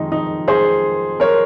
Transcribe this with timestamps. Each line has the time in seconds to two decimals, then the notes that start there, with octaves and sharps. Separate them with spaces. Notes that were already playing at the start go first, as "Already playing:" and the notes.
Already playing: F2 D#3 G#3 D#4
0.12 D#4
0.48 G#4 C5
1.20 A#4 C#5